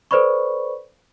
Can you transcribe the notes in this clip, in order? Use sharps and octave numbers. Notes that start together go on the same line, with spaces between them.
A4 B4 C5 D5 B5 C#6